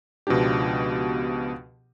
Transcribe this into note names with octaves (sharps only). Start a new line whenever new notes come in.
C#2 B2 F3 B3 D4 G4